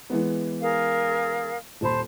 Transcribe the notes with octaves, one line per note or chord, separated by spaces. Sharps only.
E3 G#3 B3
G#4 A#4 F5
D#1 C5 A5 B5